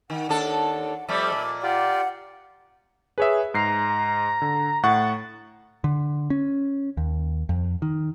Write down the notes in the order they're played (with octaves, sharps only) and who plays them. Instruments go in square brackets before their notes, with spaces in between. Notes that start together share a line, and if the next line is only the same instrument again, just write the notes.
[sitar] D#3 [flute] F#5
[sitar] D#2 D4 A4
[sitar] F2 G3 A3 [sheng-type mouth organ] D5 E5 B5 [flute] D6
[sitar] A#2
[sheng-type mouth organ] F4 G4 D5 [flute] F#5
[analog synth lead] G#4 [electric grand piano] B4 C#5 E5
[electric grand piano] G#2 C7 [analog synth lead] A#5
[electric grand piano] D3
[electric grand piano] A2 F#5 C#6 [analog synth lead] A6
[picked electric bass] D3
C#4
D#2
F2
D#3